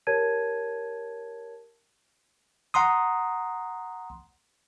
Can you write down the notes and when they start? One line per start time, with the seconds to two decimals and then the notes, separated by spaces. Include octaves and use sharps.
0.07 G4 A#4 C#5 A5 G#6 D#7
2.74 F#5 A#5 C6 D#6